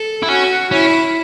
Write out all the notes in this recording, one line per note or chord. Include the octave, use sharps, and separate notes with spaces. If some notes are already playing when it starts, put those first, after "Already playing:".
Already playing: A4
E4
C#4 F#4
C#4 E4